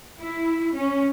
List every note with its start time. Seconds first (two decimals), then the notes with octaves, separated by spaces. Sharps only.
0.20 E4
0.74 C#4